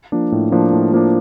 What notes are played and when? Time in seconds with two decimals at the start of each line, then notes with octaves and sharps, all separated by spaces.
0.12 F3 A#3 D4
0.32 A2
0.52 F3 A#3 D4
0.73 A2
0.93 F3 A#3 D4